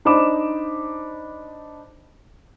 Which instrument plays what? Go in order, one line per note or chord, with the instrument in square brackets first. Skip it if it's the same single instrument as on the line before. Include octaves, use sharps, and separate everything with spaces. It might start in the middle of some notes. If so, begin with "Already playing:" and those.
[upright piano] D4 D#4 C5 B5 D6 E7